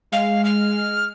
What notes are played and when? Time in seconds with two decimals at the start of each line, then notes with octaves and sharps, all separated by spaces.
0.12 G#3 F5
0.44 F6